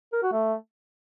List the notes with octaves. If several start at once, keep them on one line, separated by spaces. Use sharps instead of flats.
A#4
F#4
A3